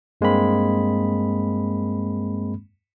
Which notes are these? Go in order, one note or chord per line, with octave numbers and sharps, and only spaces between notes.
G2 G#3 A#3 C4 B5